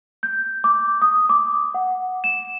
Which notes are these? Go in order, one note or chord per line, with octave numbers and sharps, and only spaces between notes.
G6
D6
D#6
D6
F#5
E7